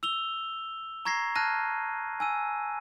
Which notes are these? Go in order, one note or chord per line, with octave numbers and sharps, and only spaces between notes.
E6 F7 G7
A#5 C#6 G#6 A#6 C7
A5 F6 F#6 G#6 A#6 D#7
G#5 E6 D#7